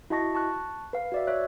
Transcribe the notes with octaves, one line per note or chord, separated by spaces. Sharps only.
E4 F#4 D#5 A5 C#6 A#6
A5 C#6 F#6
B4 F5
F#4 D5 E5
C#5 E5 F#6